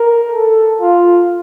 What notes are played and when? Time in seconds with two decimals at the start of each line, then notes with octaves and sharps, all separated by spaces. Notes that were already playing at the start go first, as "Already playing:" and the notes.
Already playing: A#4
0.32 A4
0.80 F4